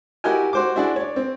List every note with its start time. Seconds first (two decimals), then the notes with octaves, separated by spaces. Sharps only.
0.24 E4 F#4 G4 A#4 D#5 G#5
0.53 F#4 C5 D6
0.76 D4 E4 F#4 G#4 D5
0.96 C#5 D5
1.16 C4